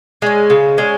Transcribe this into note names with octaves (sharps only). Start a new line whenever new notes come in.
G#3 C#4
C#3
G#3 C#4